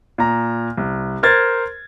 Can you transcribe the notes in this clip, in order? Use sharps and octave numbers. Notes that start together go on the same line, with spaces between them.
A#2 A#5
C2
A#4 C5 G#6 A6